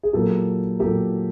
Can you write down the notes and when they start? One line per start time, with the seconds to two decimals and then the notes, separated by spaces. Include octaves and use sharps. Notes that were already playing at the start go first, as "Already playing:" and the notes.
0.03 G#4
0.13 A#2 F#3 A#3 G4 A4
0.79 A#2 F#3 A#3 G4 A4